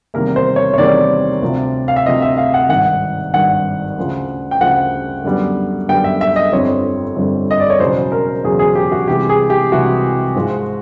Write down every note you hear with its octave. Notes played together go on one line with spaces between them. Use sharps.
E2 C3 D#3 G3 A#3 A#4
C5
C#5
C#5
E2 C3 D#3 G3 A#3 D5
D2 C3 F3
F5
E5
D2 C3 F3 D#5
E5
F5
F#5
G#1 G2 D#3 F#5
G#1 G2 D#3 F#5
D2 C#3 F3
G5
D2 C#3 F3 F#5
F#2 D3 G3 B3
F#2 D3 G3 B3 G5
E5
E5
D#5
G1 F2 D3 G3 C4 C#5
G1 F2 D3 G3 C4
D#5
D5
C#5
E1 E2 C#3 F#3 C5
A#4
E1 E2 C#3 F#3 G#4
G#4
G4
F#4
C2 C3 E3 G#3 G4
G#4
G4
C2 C3 E3 G#3 F#4
G#2 F3 G#3